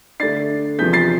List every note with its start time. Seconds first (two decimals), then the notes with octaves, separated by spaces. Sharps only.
0.20 D3 A3 D4 A6 C7
0.78 E2 C3 F3 G6 B6
0.93 A6 C7